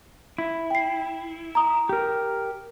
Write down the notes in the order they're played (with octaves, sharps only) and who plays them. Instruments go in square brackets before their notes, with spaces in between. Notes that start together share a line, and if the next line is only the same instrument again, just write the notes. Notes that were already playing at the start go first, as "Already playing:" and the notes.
[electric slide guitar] E4
[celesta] G5 C7
A#5 D#6
[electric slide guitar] G4 A#4